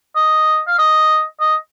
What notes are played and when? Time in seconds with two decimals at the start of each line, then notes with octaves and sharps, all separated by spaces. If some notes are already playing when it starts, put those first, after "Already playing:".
0.16 D#5
0.67 F5
0.78 D#5
1.40 D#5